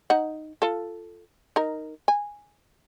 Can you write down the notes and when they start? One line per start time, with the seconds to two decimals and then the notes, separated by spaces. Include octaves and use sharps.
0.10 D#4 F#5
0.62 F4 A4
1.56 D#4 A#4
2.08 G#5